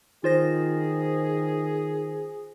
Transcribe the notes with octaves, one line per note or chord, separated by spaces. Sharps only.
D#3 F4 G#4 C5 A#6